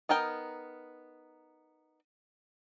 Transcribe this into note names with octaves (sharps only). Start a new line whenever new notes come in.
B3 D#4 A#4 G5